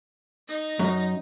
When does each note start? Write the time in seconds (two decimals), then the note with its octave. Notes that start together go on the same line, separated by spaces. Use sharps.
0.48 D#4 D#5
0.79 F#2